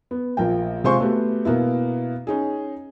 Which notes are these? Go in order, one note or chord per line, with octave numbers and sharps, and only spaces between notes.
B3
A#1 F3 A#3 G5
C3 G#3 F4 C5 C6 C#6
A3 B3 F#4 G4
B2 A#3 B3 E4
C#4 D#4 G#4